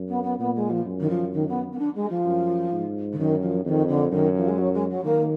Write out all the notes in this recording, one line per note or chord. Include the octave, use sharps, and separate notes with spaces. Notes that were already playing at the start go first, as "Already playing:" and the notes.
Already playing: F#2
B3
B3
A#2 B3
G#3
F3
F#2
D#3
F3
D#3
B3
B3
D4
G#3
F3
F#2
G#2
D3
F#2 D#3
F3
F2 D#3
D3
F#2 D#3
F3
G#3
F#3
G#3
F#3
D#3 A#3